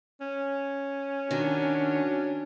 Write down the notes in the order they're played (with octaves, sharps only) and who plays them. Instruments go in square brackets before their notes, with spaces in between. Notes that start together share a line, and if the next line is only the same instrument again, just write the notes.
[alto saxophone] C#4
[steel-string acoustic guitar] D#3 [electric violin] D4 [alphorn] F#4